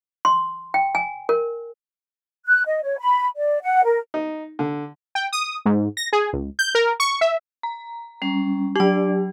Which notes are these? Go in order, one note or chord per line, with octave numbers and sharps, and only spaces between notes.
C6
G5
G#5
A#4
F#6
D#5
C#5
B5
D5
F#5
A#4
D#4
D3
G5
D#6
G#2
A#6
G#4
C#2
G6
A#4
C#6
E5
A#5
G3 C#4
F#3 D4 G4 D5